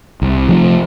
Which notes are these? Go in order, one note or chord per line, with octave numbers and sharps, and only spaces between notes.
C2
C3 F3 A3